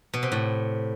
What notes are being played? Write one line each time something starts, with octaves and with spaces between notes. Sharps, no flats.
B2
C3
A2